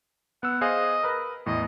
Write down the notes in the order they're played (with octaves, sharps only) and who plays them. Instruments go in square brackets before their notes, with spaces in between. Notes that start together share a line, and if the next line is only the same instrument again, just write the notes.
[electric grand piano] B3 E6 [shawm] F#5
[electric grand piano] G#4 C5 F5 [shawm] D#5
[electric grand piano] A#4 B4
[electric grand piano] E2 A2 [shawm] D#5